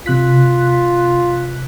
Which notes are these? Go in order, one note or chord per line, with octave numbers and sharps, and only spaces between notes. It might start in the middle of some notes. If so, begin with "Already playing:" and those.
C3 F4 F#6 B6